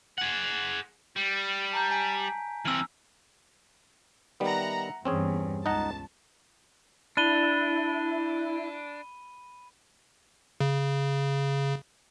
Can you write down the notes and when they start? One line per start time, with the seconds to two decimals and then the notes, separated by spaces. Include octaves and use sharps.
0.18 G#4 F#5
1.16 G3
1.73 A5 A#5 G6
1.91 G#5 B6 D7
2.65 E3 C4 E6 F6
4.40 D#3 G3 B3 E5 F#5 A#5
5.05 E2 G2 C4 C#4 G#4
5.66 C#2 D#4 F#5 A5 A#5
7.17 D4 E4 B5 D#7 G7
10.60 C#3